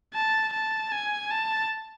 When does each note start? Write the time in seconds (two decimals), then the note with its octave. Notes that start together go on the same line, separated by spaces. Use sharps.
0.14 A5
0.53 A5
0.92 G#5
1.31 A5